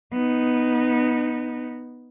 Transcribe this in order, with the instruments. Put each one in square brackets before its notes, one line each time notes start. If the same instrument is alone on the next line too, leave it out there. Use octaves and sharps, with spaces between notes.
[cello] B3 D#4